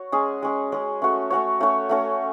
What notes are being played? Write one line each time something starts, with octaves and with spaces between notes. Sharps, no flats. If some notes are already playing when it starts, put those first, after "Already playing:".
Already playing: F#4 C#5
G#3 C#4 G#4
G#3 C#4 G#4
G#3 C#4 G#4
A3 C#4 F#4 C#5
A3 C#4 F#4 C#5
A3 C#4 F#4 C#5
A3 C#4 F#4 C#5